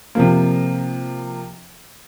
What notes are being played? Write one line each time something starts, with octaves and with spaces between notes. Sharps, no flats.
C3 F3 A#3